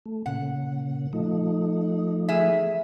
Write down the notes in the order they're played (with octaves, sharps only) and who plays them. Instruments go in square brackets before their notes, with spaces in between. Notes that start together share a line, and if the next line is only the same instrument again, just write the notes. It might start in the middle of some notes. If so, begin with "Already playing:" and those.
[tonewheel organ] A3
[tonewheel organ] A#2 C#3 [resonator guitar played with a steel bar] F#5
[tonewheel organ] F3 A3 D#4
[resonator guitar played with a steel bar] E2 G#4 E5